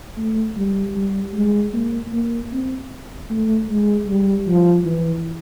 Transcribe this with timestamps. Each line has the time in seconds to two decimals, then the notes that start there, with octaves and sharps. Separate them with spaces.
0.18 A3
0.57 G3
0.96 G3
1.34 G#3
1.73 A#3
2.13 A#3
2.52 C4
3.30 A3
3.70 G#3
4.09 G3
4.47 F3
4.85 E3